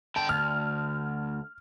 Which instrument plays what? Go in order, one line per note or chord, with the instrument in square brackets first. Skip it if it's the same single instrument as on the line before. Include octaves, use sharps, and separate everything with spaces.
[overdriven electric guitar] D3 G5 [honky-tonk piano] A5
[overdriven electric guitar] D2 [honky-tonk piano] F6